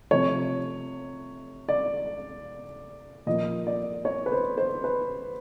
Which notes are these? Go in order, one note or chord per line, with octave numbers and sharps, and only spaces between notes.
C3 F3 A3 C#5
D5
A#2 F3 A#3 D#5
D5
C#5
B4
C5
C5
B4